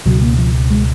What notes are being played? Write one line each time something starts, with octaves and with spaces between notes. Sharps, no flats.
C#2 B2 F#3
A#3
F3
G#3